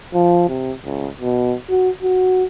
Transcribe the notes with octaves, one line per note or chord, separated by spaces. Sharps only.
F3
C3
C#2
B2
F#4
F#4